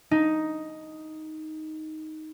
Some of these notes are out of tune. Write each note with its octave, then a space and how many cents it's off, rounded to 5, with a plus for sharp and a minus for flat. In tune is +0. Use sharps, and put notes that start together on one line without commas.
D#4 +5